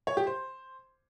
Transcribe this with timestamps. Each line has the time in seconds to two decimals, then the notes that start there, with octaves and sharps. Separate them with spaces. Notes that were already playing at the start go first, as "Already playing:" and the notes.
0.07 C#5
0.17 G4
0.27 C5